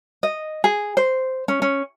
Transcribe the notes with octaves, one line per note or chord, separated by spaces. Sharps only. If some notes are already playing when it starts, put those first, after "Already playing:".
D#5
G#4
C5
C#4
C#4